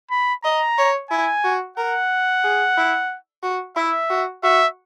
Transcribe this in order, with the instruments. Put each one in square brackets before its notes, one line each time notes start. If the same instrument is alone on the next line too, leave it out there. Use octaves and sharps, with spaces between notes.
[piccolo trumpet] B5
[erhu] D#5 [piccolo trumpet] A#5
[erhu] C#5
[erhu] E4 [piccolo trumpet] G#5
[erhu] F#4
[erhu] A#4 [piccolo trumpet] F#5
[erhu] G#4
E4
F#4
[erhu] E4 [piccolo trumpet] E5
[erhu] F#4
[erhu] F#4 [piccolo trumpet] E5